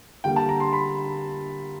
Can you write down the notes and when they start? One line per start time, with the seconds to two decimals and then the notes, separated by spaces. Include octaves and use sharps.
0.24 D3 G3 A#3 G5
0.36 A5
0.49 A#5
0.60 C6
0.73 B5